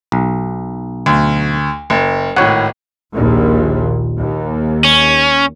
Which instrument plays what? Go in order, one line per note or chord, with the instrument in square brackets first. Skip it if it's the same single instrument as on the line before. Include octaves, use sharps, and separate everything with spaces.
[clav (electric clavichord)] B1
[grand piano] D2
F#1
[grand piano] G#1 A2 [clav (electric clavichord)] C#5 F#5
[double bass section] A#1 D#2 A#2
D#2
[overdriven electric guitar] C#4